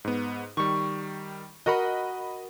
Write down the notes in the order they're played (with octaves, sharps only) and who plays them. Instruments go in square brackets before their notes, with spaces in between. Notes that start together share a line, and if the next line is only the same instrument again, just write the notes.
[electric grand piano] G#2 B3
[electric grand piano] D#3 G3 [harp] C#6
[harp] F#4 A#4 F#5 [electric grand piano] D#5 B5